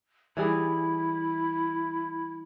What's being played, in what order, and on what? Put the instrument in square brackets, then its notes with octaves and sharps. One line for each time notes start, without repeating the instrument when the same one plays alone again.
[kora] E3 G3 G#4 [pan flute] E4